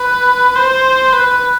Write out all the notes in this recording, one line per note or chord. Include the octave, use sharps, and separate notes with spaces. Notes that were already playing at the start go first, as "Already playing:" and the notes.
Already playing: B4
C5
B4